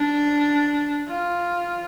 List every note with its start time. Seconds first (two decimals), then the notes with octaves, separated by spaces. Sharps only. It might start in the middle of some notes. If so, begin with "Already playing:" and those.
Already playing: D4
1.08 F4